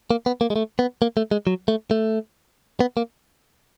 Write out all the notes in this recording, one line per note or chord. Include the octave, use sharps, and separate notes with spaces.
A#3
B3
A#3
G#3
A3
B3
A#3
A3
G#3
F#3
A3
A3
B3
A#3